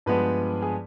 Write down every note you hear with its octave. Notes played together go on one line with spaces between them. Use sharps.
G2 F3 G#3 B3 B4
G#4